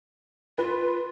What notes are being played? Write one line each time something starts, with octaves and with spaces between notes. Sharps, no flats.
F4 B4